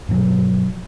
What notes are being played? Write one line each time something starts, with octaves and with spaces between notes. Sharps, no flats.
G2 B2 F3 F#3